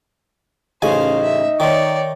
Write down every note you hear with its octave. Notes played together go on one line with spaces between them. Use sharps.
A1 C#3 D#4 C5 F5 G#5
E5
D#3 C#5 D5